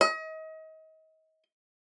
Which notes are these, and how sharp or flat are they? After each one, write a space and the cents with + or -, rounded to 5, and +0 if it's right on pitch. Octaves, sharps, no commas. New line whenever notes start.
D#5 +35